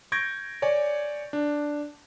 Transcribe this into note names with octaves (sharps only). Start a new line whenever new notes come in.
C#6 G6 G#6 A#6 D7
C#5 D5 G#5
D4